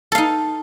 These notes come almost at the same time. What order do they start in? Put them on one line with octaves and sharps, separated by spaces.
A4 F5 D#4